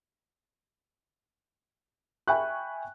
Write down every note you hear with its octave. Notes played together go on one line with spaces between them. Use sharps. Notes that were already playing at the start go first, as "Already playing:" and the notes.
E5 G5 G#5 B5 C#6 F#6